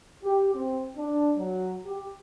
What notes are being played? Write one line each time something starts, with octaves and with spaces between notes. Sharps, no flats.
G4
C4
D4
F#3
G4